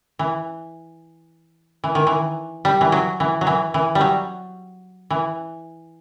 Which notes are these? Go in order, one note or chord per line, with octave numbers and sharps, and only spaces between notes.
E3
E3
D#3
E3
G3
E3
F#3
E3
F#3
E3
E3
G3
F#3
E3